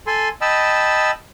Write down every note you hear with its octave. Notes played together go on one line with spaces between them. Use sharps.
A4 G#5 C6
D#5 G5 A5 B5 E6